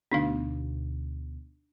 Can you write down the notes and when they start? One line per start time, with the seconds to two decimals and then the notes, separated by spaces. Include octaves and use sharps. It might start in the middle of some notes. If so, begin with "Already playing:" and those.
0.12 D2 B2 D4 D#4 F5